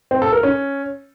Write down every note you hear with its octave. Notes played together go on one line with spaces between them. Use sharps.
C4
A4
A#4
C#4